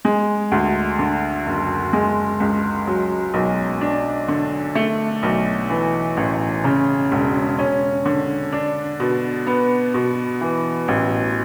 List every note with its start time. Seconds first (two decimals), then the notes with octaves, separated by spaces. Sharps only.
0.05 G#3
0.52 D2
0.99 D3
1.46 F#1
1.93 G#3
2.40 C#2
2.87 F#3
3.34 B1
3.81 D4
4.28 D3
4.75 A3
5.23 B1
5.70 E3
6.17 A1
6.64 C#3
7.12 E1
7.59 C#4
8.06 D3
8.53 D4
9.00 B2
9.47 B3
9.94 B2
10.41 E3
10.88 A1